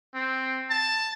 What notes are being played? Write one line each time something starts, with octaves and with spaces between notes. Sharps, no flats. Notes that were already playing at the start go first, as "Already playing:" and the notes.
C4
A5